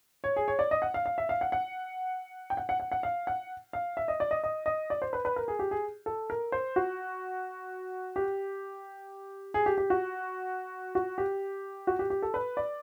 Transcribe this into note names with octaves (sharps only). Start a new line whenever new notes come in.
C#5
G#4
C#5
D5
D#5
F#5
F5
F5
E5
F5
F#5
F#5
G5
F#5
F#5
F#5
F#5
F5
F#5
F5
E5
D#5
D5
D#5
D#5
D#5
D5
C5
B4
B4
A#4
G#4
G4
G#4
A4
A#4
C5
F#4
G4
G#4
G4
G4
F#4
F#4
G4
F#4
G4
G4
A4
B4
D5